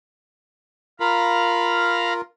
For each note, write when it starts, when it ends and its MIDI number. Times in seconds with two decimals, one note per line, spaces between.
1.00 2.21 65
1.00 2.21 70
1.00 2.13 77
1.00 2.13 82
1.00 2.13 83